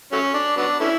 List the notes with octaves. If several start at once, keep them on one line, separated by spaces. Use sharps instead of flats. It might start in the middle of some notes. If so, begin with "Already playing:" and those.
F#3 A3 C#4
D4
F#3 B3 D4
A3 C#4 E4